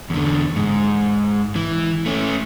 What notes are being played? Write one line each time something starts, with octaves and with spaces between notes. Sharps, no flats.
E2 D3
G#2
E3
A3 C#4